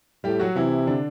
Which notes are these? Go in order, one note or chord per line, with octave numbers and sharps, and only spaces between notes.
A2 G3 G4
F#3 F#4
C3 E3 E4
D3 D4